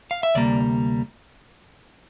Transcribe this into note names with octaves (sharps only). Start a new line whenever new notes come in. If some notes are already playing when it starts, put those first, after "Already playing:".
F5
E5
D2 C3 G3 A#3 D5